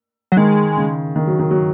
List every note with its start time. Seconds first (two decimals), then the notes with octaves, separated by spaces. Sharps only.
0.32 F#3
0.37 D#3 G#3
0.77 C#3
1.16 D#3
1.27 F#3
1.39 D#3
1.51 F#3